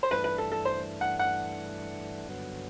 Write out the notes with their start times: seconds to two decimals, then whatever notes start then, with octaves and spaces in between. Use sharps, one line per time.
0.03 C5
0.11 G2 E3 A3 D4 B4
0.24 B4
0.38 A4
0.52 A4
0.65 C5
1.01 F#5
1.19 F#5
2.28 G2 D3 F#3 B3